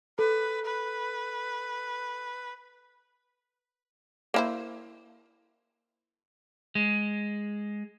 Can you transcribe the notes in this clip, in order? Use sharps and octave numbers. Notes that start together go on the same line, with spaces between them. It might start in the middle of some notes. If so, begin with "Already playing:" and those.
A4 B4
B4
A#3 E4 C5
G#3